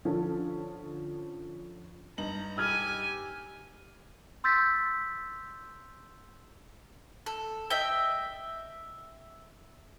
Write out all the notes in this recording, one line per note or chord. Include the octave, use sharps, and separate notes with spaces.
D3 F3 C#4 A4
G2 D#4 A#5 F#7
G4 G#5 E6 F6 G#6
C6 E6 G6 A6 B6
A4
D#5 E5 G5